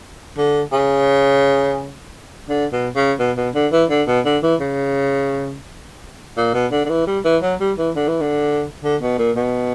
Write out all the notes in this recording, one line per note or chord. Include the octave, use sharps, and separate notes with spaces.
D3
C#3
D3
B2
C#3
B2
B2
D3
E3
D3
B2
D3
E3
C#3
A#2
B2
D3
D3
E3
G3
E3
F#3
G3
E3
D3
E3
D3
D3
B2
A#2
B2